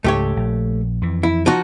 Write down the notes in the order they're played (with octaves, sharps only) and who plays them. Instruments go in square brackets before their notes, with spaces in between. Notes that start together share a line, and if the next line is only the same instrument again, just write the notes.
[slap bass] C#2 G#2 [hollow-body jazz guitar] A3 G4 C#5
[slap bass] A#1
F2 E3
[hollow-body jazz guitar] E4
F3 D#4 F#4